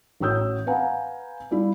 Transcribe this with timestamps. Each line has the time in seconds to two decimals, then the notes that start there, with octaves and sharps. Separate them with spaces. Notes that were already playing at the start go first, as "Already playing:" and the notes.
0.20 A1 F#4 C#5 D#6 E6 G6
0.67 B4 F5 F#5 G#5 A#5
1.51 G3 E4 F4 D5